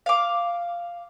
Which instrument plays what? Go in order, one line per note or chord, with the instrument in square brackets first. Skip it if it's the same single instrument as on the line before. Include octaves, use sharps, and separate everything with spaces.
[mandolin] F5 D6